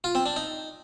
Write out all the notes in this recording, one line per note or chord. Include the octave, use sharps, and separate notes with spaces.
F4
C4
D4
D#4